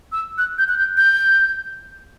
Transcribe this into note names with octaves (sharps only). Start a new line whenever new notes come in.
E6
F#6
G6
F#6
G6
G6